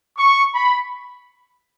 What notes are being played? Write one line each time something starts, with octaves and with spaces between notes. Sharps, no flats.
C#6
B5